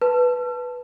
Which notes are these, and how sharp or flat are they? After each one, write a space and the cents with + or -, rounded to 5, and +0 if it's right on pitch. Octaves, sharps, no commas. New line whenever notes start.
B4 -5 A5 +0